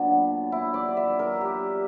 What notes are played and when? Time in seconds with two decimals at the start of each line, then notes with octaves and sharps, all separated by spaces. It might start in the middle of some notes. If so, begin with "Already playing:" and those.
Already playing: A#2 F#3 B3 D4
0.52 E4
0.74 D5
0.97 E5
1.19 A#4
1.41 G4